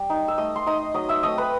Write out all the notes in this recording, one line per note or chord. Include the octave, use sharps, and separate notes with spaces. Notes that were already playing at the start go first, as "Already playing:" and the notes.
Already playing: G3
D#4
E6
A3 D#5 D#6
C6
D#4 D#5 D#6
F#3 D#5 D#6
E5 E6
A3 C4 D#5 D#6
B4 B5